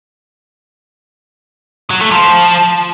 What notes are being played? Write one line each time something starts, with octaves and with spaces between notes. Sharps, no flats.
F#3
A3
F3